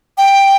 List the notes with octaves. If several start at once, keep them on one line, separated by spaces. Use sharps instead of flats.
G5